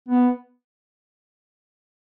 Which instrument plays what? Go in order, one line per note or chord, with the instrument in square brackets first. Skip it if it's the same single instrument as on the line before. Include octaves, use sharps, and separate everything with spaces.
[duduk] B3